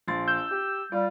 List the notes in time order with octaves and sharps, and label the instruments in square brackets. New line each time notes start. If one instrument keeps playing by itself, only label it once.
[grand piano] A#1 C6 A6
[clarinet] E6 [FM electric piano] G6
[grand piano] G4
[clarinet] G3 [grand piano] F4